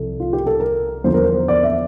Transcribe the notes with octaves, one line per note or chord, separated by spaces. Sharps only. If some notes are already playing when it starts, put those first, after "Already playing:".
Already playing: C2 F3 A4
F4
G4
A4
A#4
E2 D3 F3 C5
A#4
C5
D5
E5